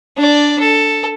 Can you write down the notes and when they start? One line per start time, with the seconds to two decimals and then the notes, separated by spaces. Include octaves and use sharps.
0.17 D4 D5
0.60 A4